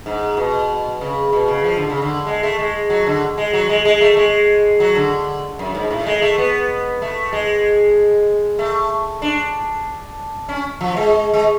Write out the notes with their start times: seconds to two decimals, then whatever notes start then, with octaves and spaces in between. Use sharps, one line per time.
0.06 G#2
0.37 B2
1.01 C#3
1.32 B2
1.48 C#3
1.64 F3
1.76 D3
1.90 C#3
2.02 D3
2.27 G#3
2.43 A3
2.59 G#3
2.90 F#3
3.07 D3
3.38 G#3
3.53 F#3
3.69 G#3
3.85 G#3
4.01 A3
4.17 G#3
4.80 F#3
4.95 D3
5.59 F#2
5.75 G#2
5.90 A2
6.06 G#3
6.22 A3
6.38 B3
7.02 A3
7.33 G#3
8.59 A3
9.22 D4
10.49 C#4
10.81 F3
10.97 G#3
11.34 G#3